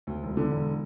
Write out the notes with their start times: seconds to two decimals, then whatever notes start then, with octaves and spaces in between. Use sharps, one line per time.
0.07 D2
0.23 E1
0.37 D3
0.51 E1